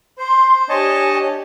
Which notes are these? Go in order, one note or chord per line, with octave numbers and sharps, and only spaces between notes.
C5 C6
D4 G4 C#5 D#5 G#5 A5